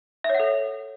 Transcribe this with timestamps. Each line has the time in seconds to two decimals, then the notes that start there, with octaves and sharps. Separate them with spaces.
0.24 E5
0.29 C#5
0.35 F#5
0.40 A4